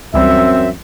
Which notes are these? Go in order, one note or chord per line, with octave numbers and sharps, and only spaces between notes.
C#2 F#2 E3 G3 C4 E5